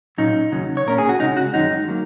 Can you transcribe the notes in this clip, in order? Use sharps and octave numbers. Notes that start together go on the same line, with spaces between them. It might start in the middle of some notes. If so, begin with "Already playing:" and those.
A#2 F#3 C#4 D#4
D#2 C#3 F#3
C#5
A#2 A#3 C#4 A#4
G#4
F#4
C#2 C#3 G#3 C#4 D#4
F#4
F#2 D#3 G#3 C#4 D#4
F#3 A#3